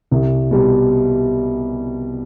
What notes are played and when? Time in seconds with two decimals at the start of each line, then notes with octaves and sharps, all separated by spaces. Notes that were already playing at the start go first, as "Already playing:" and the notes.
0.11 C2
0.51 B2 G3